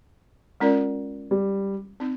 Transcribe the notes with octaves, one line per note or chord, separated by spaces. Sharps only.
G#3 C#4 F4 A#4 D5
G3
C4 D#4